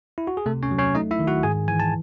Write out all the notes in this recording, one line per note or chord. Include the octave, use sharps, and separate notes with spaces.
E4
F#4
G#4
C3 A3 A4
C#4 C#5
F#3
C#4 C#5
A3 D#4 D#5
E4 E5
D#3
F#4 F#5
G#2 G#4 G#5
E3 G#5
A5